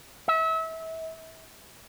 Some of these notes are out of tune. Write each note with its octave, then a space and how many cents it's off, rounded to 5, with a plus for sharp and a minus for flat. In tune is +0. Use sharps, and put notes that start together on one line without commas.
E5 -30